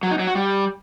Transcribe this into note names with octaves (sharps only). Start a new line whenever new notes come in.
F#3
D#4
F#3
F#4
G3